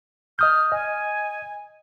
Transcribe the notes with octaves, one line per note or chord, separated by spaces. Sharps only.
D#5 D#6 F6 G6
D#5 G#5